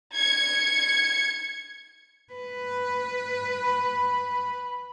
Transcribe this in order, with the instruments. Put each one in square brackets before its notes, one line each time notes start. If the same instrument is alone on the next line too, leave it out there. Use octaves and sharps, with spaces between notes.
[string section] G#6 C#7
[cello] B4
[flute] B5